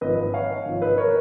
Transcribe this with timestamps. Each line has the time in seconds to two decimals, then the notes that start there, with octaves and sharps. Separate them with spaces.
0.01 G#1 G#2 F3 B4 D#5
0.34 C#5 F5
0.66 G#1 G#2 F3
0.82 B4 D#5
0.98 A#4 C#5